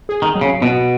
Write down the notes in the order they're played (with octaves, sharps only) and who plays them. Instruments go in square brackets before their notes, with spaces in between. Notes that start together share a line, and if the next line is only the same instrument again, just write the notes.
[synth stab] G#4
[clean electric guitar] D#3
[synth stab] F#3
[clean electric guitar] C#3
[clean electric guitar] B2 [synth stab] B3